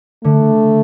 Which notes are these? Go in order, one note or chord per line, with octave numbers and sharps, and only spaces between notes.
D3 A3